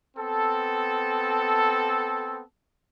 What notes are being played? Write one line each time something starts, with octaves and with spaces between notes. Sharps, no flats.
B3 C4 A4